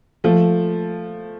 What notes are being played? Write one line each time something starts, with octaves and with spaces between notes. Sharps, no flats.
F3 A3